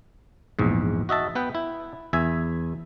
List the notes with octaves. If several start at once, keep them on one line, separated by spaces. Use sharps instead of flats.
A#1 E2 G#2
F#4 D#5 E5 A5
B3 B4 G5
E4
E2 E5 G#5